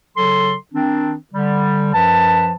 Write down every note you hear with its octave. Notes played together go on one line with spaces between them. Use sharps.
C#3 F#3 A4 C6
D#3 C4 D4
D3 G3
F#2 F3 B4 A5